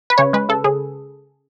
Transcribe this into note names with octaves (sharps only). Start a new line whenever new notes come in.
B4
C#3 C#5
G#3 B4
C#3 A4
C#3 G#4